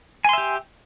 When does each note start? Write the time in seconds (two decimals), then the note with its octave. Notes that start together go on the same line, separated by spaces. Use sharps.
0.25 G#5
0.29 C6
0.33 E5
0.38 G4